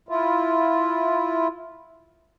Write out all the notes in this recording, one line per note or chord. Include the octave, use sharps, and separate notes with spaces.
E4 F4